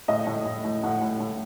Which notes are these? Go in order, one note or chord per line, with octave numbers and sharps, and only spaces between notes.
A2 D#5
A2
A2
A2
A2 F#5
A2
A2